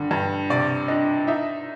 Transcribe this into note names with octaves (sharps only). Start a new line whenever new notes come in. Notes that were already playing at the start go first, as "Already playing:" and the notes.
Already playing: G2 D3
G2
C3 D5
D4 D#5
D#4 E5